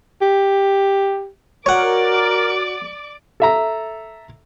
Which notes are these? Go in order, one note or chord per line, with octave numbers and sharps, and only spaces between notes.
G4
F#4 A#4 C#5 D5 F#5 D6
A4 E5 A#5